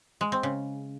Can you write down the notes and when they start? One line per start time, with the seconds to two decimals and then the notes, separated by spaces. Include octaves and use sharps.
0.21 G#3
0.32 C4
0.43 C#3